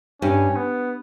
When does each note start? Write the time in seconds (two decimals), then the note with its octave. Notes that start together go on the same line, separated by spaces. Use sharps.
0.22 G2 C#4
0.56 B3